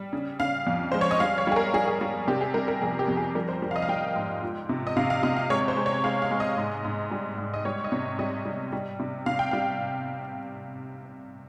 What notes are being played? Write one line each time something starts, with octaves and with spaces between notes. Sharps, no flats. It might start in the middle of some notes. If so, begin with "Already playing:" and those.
Already playing: G3
C#3
C#3 F5
F2
G#3 C5
C#5
D#5
G3 F5
C#5
G3 G#4
A#4
G3 G#4
G#4
G3
C3 G4
G#4
G3 A#4
A#4
F2 G#4
G4
F2
G#4
G3 A#4
C5
G3
F5
D#5
F5
G3 G5
G#2
F3
C3
D#5
C3 F5
F5
C3 D#5
F5
G#3 C#5
C#5
C5
G#3
C#5
G#3 F5
F5
G#3
D#5
G#2
G#2
G3
G#2
D#5
G3 C#5
D#5
C3 C#5
G3 D#5
G3
G3
C3
C3 F5
G5
G3 F5